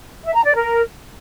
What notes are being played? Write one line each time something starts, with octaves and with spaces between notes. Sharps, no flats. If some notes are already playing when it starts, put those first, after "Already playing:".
E5
A#5
D5
A#4